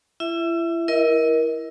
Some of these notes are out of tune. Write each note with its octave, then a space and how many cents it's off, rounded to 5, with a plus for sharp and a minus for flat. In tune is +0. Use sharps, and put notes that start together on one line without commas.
E4 +35 E5 -5
E4 +0 A#4 +20 D#5 +25